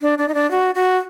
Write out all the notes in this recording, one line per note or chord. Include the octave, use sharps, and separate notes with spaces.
D4
D4
D#4
D4
F#4
F#4